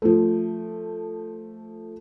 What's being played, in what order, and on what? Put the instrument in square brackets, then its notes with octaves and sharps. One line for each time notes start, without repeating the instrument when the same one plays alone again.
[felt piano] F3 A3